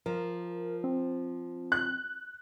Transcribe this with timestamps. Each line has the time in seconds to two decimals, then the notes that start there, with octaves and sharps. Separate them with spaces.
0.06 F3 A#4
0.84 C4
1.72 F#6